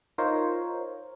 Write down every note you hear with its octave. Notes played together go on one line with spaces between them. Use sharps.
D#4 F4 A#4 C5 C#5